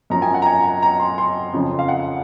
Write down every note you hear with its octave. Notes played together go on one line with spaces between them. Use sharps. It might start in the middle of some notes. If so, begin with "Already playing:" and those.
F#2 F3 A#5
G#5
F#5
A#5
G#5
A#5
A#5
C6
C6
F2 C#3 F3
F5
F#5